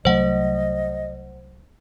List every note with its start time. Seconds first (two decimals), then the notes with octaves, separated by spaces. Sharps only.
0.05 C2 F#3 A3 C5 D#5 F#5